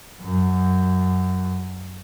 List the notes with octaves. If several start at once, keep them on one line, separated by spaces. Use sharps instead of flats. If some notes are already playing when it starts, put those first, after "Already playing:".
F#2